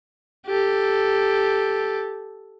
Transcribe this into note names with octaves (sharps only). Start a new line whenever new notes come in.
G4 A4